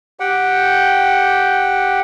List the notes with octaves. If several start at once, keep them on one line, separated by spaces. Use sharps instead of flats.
G4 F#5 G5